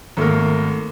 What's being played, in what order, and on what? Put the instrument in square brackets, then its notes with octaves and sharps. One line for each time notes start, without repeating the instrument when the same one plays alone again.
[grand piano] G#1 A3 A#3 A#4